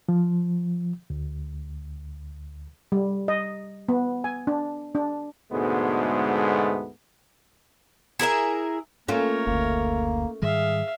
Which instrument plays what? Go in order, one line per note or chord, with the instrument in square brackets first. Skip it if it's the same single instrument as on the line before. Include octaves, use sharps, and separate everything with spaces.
[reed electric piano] F3
D2
[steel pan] G3
D#5
B3
G#5
D4
D4
[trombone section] D2 G#2 B2 G#3 A3 B3
[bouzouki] E4 G#4 A#4 E5
[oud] A3 C#4 F4 [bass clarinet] A#3 [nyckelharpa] A#4 C#5
[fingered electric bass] F#1 D2 [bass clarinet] A#3
[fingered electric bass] G#2 D#3 G3 [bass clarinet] G#4 [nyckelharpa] E5 F5